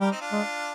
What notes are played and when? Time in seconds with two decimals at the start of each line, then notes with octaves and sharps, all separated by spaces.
0.01 G3 G4 A#4
0.11 C4 D#4
0.21 D4 F4
0.32 G#3